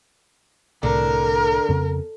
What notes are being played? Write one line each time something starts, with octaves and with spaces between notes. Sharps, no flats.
C2 A2 D3 A#4
F2 C#3 B3